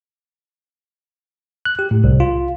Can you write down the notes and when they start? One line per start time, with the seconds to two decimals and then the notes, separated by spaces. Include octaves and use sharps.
1.65 F#6
1.79 G4
1.91 A2
2.04 C2
2.20 F4